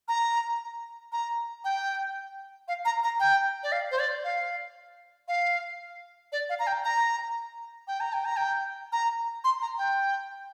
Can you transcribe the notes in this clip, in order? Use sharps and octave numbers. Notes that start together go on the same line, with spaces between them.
A#5
A#5
G5
F5
A#5
A#5
G5
D5
F5
C5
D5
F5
F5
D5
F5
A#5
G5
A#5
G5
A#5
G5
A#5
G5
A#5
C6
A#5
G5